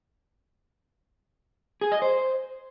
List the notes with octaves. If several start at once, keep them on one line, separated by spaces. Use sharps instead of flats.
G#4
D#5
C5